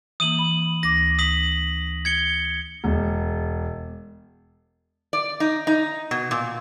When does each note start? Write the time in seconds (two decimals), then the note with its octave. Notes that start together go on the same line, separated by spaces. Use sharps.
0.20 E3 A#3 D#6 D#7 F#7
0.39 B5
0.83 D2 D6 A#6
1.19 D#6 B6 F#7
2.05 G#6 C#7 G7
2.84 E1
5.13 D5
5.40 D#4
5.67 D#4
6.11 B2
6.31 A#2